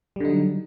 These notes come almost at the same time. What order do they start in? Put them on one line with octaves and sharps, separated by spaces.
G3 D3 D#4 F#3